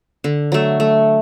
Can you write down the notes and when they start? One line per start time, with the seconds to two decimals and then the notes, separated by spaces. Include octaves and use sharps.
0.24 D3
0.52 F#3 A3
0.80 A3